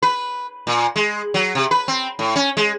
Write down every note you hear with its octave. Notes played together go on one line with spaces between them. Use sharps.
B4
A#2
G#3
F#3
C3
B4
C4
A2
C#4
G#3